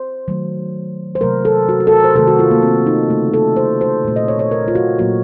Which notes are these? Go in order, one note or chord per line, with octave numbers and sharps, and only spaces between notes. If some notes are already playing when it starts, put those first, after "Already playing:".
Already playing: C5
D#3 F#3 A3
C5
C3 F#3 A3 A#4
A4
F#4
F#4
A4
A#4
C5
C3 D#3 A3 A4
F#4
F4
A#3
C4
D#4
C#3 A3
A4
C5
C5
A#2 A3
D#5
C#5
C#5
A#4
F4
F#4
A#2 F#3 A#3 F#4